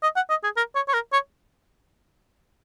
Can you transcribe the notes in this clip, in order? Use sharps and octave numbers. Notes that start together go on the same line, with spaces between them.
D#5
F#5
D#5
G#4
A#4
C#5
C#5
A#4
C#5